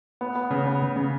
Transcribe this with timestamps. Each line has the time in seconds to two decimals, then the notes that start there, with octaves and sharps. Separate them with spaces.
0.21 B3
0.35 B3
0.51 C#3
0.67 B3
0.82 C#3
0.96 C#3